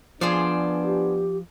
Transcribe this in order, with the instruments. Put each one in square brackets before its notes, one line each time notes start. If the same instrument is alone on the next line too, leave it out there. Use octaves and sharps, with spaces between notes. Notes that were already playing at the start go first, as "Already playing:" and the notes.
[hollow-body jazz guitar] F3 [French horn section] B3 D4 [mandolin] G#4 C5 D5
[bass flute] G4